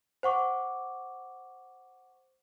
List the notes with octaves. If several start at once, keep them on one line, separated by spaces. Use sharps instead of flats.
C5 F#5 C#6 D6